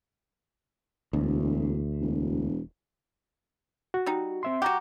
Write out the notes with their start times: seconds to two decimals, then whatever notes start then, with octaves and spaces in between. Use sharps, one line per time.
1.13 E1 D2
2.01 E1
3.94 F#4
4.06 G3 D#4
4.43 C4 E5 C6
4.62 F#4 G4 F#5 A#5